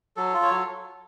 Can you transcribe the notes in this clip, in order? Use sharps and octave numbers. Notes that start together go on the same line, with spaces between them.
F#3 A4
F4
C#5
F#3